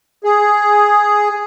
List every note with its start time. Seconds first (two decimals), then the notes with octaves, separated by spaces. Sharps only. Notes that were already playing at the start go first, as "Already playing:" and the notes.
0.24 G#4